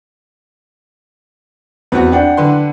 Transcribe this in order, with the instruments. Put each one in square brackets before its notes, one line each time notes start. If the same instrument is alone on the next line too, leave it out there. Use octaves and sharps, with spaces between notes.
[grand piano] E2 [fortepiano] B3 C4 F#4
[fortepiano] D4 [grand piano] F#5 G5
[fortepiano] D3 B4 C6